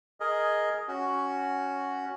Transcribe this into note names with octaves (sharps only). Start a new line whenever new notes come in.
G#4 A#4 D#5
C#4 F#4